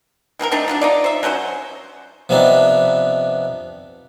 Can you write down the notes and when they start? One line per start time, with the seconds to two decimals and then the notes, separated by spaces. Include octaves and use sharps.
0.39 E3 C4 G#4 A#4
0.52 A3 C4 D4 D#4
0.68 F3 F#3 D4
0.81 D#4 F4 D5
1.04 C5 E5
1.23 F#3 A3 C#4 C5
2.29 C3 F3 B3 C4 D4 D#4